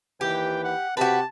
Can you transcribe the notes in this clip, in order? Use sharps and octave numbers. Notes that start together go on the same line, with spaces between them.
D#2 E3 G4 B4 G5
F#5
C3 F#4 G4 B4 A5